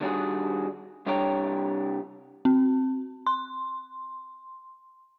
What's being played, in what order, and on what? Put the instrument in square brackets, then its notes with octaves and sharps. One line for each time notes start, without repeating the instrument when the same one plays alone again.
[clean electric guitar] D#3 G3 D4 D#4 F#4 G#4
C2 G3 D4 C#5 G5 A#5
[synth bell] C4
C6